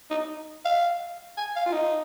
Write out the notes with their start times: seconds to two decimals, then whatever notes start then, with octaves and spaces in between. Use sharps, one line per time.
0.10 D#4
0.65 F5
1.37 G#5
1.56 F5
1.66 F4
1.73 D#4